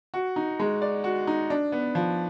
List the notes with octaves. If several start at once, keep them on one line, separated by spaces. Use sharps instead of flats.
F#4
D#4
G#3
D5
F#4
D#4
D4
B3
F3